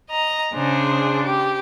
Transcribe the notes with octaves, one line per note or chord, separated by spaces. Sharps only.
D#5 A#5
C#3 D4 G#4 C5
G4